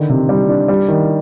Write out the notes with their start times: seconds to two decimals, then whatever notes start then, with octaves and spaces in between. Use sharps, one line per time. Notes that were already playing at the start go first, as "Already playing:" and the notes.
Already playing: D3 D#3
0.09 C3
0.29 G3
0.49 D4
0.68 G3
0.88 D#3